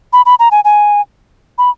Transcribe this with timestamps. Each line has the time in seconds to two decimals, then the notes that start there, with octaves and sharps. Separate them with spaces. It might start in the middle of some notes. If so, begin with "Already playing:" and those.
0.13 B5
0.26 B5
0.39 A#5
0.51 G#5
0.65 G#5
1.58 B5